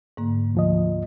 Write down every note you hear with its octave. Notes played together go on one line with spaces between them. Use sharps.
G#2 D3 A#3
D2 F3 D#5